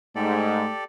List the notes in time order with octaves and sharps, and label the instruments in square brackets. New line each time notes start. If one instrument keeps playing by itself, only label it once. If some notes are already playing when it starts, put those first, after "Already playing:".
[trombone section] G#2 [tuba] A3 [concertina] G4 A4 D5